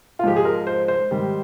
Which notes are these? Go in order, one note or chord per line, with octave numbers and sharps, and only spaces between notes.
F4
G#2 F3 G#3 G4
G#4
A#4
C5
C5
G#2 D#3 G3